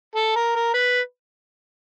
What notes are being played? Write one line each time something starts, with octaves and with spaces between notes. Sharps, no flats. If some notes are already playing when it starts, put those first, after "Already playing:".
A4
A#4
A#4
B4